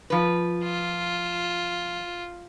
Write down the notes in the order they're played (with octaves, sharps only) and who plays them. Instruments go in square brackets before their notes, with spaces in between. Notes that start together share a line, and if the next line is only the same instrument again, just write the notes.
[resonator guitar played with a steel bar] F3 B4
[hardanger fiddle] F4